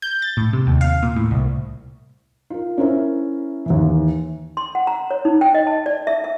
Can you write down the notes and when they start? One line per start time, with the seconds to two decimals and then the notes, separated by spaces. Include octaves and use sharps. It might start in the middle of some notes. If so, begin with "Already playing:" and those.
0.02 G6
0.22 A6
0.37 A2
0.53 C3
0.67 D#2
0.81 F5
1.03 A#2
1.16 A2
1.31 C2
2.50 F4 A#4
2.78 C#4 E4 A#4 C5 E5
3.66 D#2 E3
4.57 C6
4.75 F#5
4.87 A#5
5.11 C#5
5.25 D#4
5.41 G5
5.55 D#5
5.67 A5
5.86 D5
6.07 E5
6.24 E5